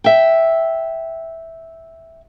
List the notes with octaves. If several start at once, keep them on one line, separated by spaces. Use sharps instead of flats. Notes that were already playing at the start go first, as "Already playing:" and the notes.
E5 G5